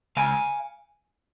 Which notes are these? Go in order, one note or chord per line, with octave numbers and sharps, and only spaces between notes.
C#2 F5 G#5